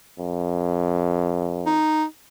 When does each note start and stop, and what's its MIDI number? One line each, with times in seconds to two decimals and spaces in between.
0.19 1.80 41
1.66 2.04 63